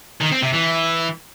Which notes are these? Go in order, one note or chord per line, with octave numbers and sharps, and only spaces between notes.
D#3
C4
C3
E3